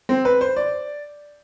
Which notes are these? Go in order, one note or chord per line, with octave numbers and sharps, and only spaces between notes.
C4
B4
C5
D5